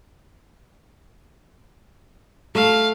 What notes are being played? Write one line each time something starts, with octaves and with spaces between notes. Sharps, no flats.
A3 F5